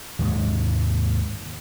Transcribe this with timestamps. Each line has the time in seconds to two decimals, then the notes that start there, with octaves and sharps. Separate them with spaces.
0.19 D#2 G#2 G#3